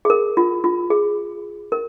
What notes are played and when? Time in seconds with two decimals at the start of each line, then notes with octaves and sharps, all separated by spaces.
0.05 G#4
0.10 A#4
0.37 F4
0.64 F4
0.90 G#4
1.72 A#4